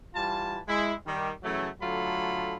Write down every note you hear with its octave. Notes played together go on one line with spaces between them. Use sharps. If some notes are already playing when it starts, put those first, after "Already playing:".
E3 G3 F4 A5
G#3 E4
D#3 G3
C#3 E3 F#3 A3
D3 F#3 A3 F4 A4 B5